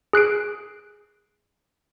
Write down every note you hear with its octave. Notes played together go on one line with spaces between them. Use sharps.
G#4 F#6 C7 D7